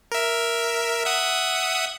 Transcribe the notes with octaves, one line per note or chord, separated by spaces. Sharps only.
A#4 E5
E5 F#5 D#6